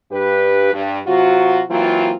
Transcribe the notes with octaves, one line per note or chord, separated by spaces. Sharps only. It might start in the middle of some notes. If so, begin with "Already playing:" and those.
G2 G4 B4
G2
C3 F#3 F4 F#4
E3 F#3 A#3 C4 F4